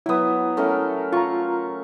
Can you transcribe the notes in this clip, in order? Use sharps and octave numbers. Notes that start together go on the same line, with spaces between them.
F#3 B3 E4 D#6
A3 C#4 A#4
F4 A#5 C#6